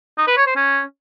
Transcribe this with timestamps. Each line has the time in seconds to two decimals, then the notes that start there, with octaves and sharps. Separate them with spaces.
0.18 D#4
0.28 B4
0.37 C#5
0.47 C5
0.56 C#4